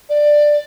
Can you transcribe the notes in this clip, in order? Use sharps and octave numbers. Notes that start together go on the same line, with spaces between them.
D5